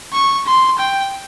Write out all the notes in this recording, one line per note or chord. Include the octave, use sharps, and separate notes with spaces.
C#6
C6
G5